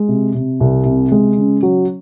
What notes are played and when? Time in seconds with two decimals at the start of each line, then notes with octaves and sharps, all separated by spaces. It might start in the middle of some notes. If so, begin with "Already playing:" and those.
Already playing: G#3
0.08 C3
0.35 C3
0.60 C2
0.85 C3
1.12 G#3
1.37 C#3
1.63 F#3